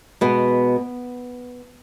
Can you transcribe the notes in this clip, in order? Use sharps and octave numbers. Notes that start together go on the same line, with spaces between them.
B2 G#3 B3